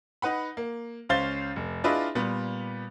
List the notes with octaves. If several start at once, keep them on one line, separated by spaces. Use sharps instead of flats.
D#4 B4 F#5 B5
A#3
C#2 C#4 C5 F5 A6 G7
F1
D4 E4 F4 G#4 B4 D#5
A#2 G3 B3